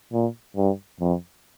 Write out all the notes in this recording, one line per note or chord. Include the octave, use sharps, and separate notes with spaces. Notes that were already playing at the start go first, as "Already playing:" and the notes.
A#2
G2
F2